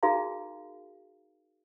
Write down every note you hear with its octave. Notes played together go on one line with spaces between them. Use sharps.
D#4 F#4 G#4 A#4 F5 A#5